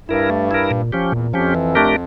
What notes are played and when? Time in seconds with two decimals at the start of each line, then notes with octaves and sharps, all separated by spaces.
0.09 G2 E4 A#4
0.30 A3
0.51 E4 A#4
0.71 A#2
0.92 F3 C#4 G4
1.12 E2 A#2
1.33 F2 F3 C#4 G4
1.55 E3
1.75 A3 D4 G4 A#4